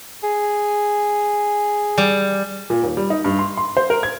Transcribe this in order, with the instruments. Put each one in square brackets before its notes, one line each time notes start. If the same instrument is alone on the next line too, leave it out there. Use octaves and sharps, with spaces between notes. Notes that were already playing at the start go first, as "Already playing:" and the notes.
[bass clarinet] G#4
[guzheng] G3
[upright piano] A#2
D#2
G3
D#4
G2
C6
C6
C5
A#4
G#6